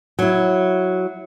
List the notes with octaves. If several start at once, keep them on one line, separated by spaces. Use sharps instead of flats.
F#3 E4